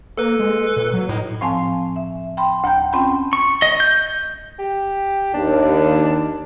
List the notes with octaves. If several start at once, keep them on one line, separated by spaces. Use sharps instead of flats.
A#3 A4 B4
G#3
A#2
F#3
A2 D#4
A2 F3 C4 F5 G#5 A5
E5
G5 B5 C6
D2 G5 A#5 G6
C4 C#4 F4 G5 A5 B5
C#6
D#5
G6
G4
D#2 D4